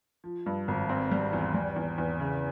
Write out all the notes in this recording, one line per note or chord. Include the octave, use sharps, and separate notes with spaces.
F3
G2
G#1
C4
G3
E2
G3
E2
E2
C#3